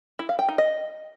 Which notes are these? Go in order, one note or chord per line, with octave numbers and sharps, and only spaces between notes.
E4
F5
G5
D#4
D#5